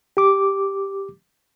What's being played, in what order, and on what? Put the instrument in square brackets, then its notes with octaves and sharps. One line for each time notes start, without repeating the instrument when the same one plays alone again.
[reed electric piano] G4 D6